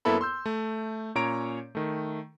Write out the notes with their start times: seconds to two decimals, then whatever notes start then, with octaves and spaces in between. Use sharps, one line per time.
0.05 F#2 A#3 B3 E4 A4 B5
0.21 C6 E6 G6
0.46 A3
1.15 A#2 C#4 C#5 A#5 D7
1.75 D#3 A3